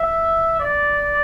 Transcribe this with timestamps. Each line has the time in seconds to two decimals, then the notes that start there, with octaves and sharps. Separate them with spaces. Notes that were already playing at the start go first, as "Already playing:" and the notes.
Already playing: E5
0.59 D5